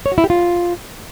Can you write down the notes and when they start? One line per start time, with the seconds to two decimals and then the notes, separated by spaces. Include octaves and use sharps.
0.06 C#5
0.12 F#4
0.18 E4
0.24 G4
0.30 F4